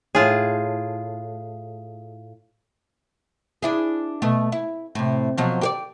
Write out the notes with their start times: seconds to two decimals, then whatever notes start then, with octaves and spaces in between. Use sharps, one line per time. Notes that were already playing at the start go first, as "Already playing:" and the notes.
0.15 A2 F4 G#4
3.62 D4 E4 G#4
4.22 B2 A3
4.52 E4
4.95 A2 C3
5.37 B2 F3 F#3
5.61 G4 A4 D5